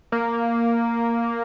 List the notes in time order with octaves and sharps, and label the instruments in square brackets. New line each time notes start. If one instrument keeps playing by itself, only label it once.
[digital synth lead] A#3